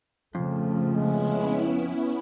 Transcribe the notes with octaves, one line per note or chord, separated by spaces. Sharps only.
F2 C#3 F3 A3
G#3 B3 C#4 E4